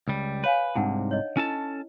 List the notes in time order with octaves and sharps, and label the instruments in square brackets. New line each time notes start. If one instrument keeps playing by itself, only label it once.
[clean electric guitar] C#2 G3
[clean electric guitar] B4 [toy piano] C#5 F5 G#5
[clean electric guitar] C2 G#2 C3 [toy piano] D4 D#4 F#5
[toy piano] C#5 D#5
[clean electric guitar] C#4 A4 A5 [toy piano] E4